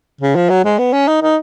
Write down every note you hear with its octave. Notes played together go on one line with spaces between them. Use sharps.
C#3
F3
F#3
G#3
B3
C#4
D#4
D#4